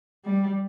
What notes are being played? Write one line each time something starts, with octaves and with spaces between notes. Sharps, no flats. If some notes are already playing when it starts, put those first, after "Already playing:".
G3